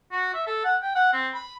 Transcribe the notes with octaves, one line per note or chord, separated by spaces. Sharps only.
F#4
E5
A4
F#5
G5
F#5
C4
B5